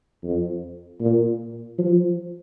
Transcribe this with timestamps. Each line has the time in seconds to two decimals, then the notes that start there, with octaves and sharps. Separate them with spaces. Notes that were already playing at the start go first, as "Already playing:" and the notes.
0.24 F2
1.00 A#2
1.79 F3